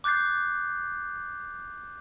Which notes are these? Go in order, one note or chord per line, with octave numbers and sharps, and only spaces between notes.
D6 F#6 G6 A6 C7